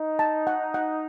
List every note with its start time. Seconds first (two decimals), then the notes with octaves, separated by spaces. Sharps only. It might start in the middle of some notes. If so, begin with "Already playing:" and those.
Already playing: D#4
0.19 A5
0.47 F#5
0.74 F#5